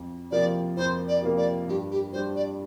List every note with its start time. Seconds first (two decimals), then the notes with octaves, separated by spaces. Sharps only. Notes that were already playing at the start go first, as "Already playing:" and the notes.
Already playing: F2
0.31 C3 F3 A#3 D5
0.77 F2 C5
1.08 D5
1.22 C3 F3 A#3
1.37 D5
1.68 G2 G4
1.91 G4
2.13 G3 D4 F4 C5
2.36 D5